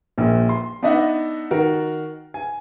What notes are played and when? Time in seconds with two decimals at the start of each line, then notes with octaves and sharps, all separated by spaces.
0.18 A#1 A#2
0.49 C6
0.83 B3 D4 D#4 D#5 E5 F#5
1.51 D#3 F#4 A#4
2.34 G#5